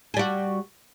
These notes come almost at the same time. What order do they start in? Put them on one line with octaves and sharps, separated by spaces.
G#4 G3 F#4